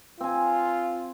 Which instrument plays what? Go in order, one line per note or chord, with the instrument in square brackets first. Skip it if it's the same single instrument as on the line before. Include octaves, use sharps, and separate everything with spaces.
[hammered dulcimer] C4 G#5 [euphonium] F4